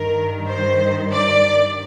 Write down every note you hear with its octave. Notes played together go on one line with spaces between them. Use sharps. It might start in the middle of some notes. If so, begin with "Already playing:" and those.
Already playing: G2 D#3 A#4
C5
D5